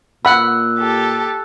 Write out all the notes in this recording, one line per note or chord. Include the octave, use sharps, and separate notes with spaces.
A#2 F#5 B5 E6 F#6
G4 A4